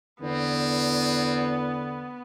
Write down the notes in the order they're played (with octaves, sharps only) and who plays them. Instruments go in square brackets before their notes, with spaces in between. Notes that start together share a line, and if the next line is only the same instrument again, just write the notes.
[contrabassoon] E2 [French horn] D3 [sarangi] B3 [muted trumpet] C4